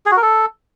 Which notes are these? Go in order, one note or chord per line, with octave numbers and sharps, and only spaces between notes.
G#4
F#4
A#4
A4